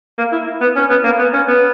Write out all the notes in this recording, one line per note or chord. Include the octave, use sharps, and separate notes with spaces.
A#3
E4
B3
C#4
B3
A#3
B3
C#4
B3